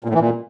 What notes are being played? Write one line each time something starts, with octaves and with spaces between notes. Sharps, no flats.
A#2
A2
E3
A#2